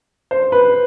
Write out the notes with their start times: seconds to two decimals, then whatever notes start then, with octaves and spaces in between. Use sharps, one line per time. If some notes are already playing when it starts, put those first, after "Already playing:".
0.31 C5
0.52 B4